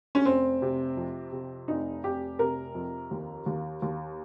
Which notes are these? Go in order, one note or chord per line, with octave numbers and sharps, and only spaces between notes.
C#4
F1 C4
C3
F2
C3
F1 D#4
F1 G4
C3 A#4
F2
D#2
D#2
D#2